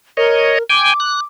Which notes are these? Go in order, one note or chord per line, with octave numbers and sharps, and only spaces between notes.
A#4 C#5 D#5
G5 G#5 D6
F#6